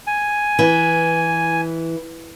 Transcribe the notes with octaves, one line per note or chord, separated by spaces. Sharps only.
G#5
E3